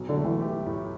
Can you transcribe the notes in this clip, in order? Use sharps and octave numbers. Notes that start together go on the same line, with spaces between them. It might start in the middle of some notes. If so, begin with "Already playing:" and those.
Already playing: B1 B2
D3
A3
E3
G4
A2